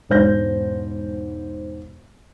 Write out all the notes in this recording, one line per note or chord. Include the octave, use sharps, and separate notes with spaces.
E1 G#2 C5 G6 A#6